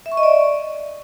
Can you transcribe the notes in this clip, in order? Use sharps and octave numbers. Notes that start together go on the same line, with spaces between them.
E5
C#6
D#5
D5